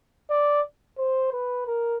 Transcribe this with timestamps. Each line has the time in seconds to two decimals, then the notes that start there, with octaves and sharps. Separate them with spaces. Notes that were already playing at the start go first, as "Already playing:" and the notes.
0.31 D5
0.98 C5
1.33 B4
1.67 A#4